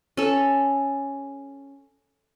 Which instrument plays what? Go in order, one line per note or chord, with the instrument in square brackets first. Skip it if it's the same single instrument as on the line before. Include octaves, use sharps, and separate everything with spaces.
[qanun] C#4 A4